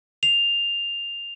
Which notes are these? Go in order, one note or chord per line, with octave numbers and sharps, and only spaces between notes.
F7